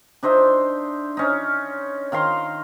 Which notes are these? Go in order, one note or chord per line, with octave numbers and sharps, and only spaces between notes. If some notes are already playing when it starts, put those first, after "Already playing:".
D4 D#4 C5 E5
C#4 D#4
D#3 F5 A#5 C6